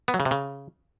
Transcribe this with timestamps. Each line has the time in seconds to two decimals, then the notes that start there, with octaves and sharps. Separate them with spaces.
0.08 B3
0.14 F#3
0.20 C#3
0.25 C3
0.31 C#3